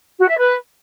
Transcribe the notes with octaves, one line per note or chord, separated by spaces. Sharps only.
F#4
E5
B4